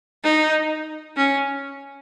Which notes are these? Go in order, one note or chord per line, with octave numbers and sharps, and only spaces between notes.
D#4
C#4